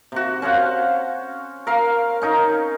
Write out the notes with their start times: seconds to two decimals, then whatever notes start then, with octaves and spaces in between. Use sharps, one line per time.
0.12 C3 F#4
0.42 C#4 C5 F5 F#5
1.67 A#4 F5
2.22 C#4 D#4 A#4